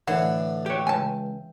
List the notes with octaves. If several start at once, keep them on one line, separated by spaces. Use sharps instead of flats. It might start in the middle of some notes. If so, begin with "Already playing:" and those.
A2 D3 E3 F#5
G4 C#5 G5
C#2 G#5 A5